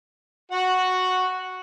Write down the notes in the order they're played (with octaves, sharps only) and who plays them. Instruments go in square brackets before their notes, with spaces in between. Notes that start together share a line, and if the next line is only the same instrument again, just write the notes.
[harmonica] F#4 F#5